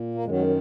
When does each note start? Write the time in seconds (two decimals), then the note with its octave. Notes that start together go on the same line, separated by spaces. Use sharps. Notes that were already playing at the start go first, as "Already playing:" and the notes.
Already playing: A#2
0.14 A#3
0.24 F#2 D#3 F#3 G#3
0.38 G#3
0.46 F#3